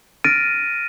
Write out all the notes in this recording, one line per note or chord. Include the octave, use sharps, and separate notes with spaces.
F6 A6 A#6 D7 D#7